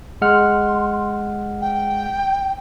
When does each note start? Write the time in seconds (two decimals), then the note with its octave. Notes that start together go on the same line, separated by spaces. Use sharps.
0.22 G#3 F#5 C6 F6
1.61 G5